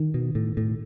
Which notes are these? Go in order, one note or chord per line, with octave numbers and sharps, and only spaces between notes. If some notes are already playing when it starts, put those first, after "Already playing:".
Already playing: D#3
B2
A2
A2